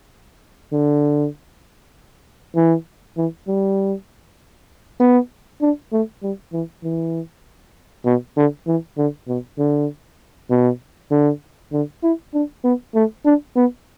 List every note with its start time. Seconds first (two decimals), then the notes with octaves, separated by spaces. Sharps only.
0.73 D3
2.56 E3
3.18 E3
3.48 G3
5.00 B3
5.62 D4
5.93 A3
6.23 G3
6.53 E3
6.84 E3
8.06 B2
8.37 D3
8.67 E3
8.98 D3
9.28 B2
9.58 D3
10.50 B2
11.11 D3
11.73 D3
12.03 E4
12.34 D4
12.64 B3
12.95 A3
13.25 D4
13.56 B3